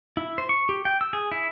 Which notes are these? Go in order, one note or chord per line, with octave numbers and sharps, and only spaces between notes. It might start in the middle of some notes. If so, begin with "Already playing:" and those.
E4
C5
C#6
G4
G5
E6
G#4
E4